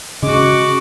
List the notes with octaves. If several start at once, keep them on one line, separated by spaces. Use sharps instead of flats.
C#3 G#3 C#4 F#4 D6